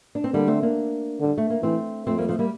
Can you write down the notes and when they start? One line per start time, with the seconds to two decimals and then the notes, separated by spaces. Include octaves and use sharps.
0.15 D4
0.24 C4
0.33 D3 G3 A#3
0.47 A3 C4
0.62 A#3 D4
1.20 D3 G3
1.38 A3
1.50 A#3
1.63 E3 A3 C4
2.07 F2 A3 C4
2.18 G3 A#3
2.28 F3 A3
2.39 G3 A#3